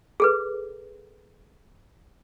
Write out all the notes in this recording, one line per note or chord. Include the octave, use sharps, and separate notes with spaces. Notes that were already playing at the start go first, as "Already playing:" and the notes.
G#4 A4 B4